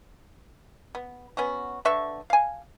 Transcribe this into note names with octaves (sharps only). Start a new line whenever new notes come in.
B3
B3 C#4 F#4
D3 B4 E5 C#6
F5 G#5